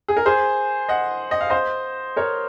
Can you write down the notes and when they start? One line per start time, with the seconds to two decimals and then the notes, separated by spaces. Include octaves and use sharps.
0.08 G#4
0.17 A#4
0.26 G#4 C5
0.89 D#5 F#5
1.31 D#5
1.40 F5
1.50 C5 D#5
2.16 A#4 C#5